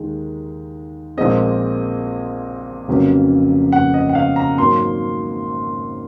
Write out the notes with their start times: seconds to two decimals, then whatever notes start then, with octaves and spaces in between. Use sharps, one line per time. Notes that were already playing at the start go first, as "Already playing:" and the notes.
Already playing: D#2 D#3 G#3
1.17 A#1 A#2 G#3 C4 D#5
2.88 F1 F2 C#3 F#3 A#3
3.72 F#5
3.94 D#5
4.09 F#5
4.15 F5
4.36 A#5
4.58 G#1 G#2 F#3 A#3 C6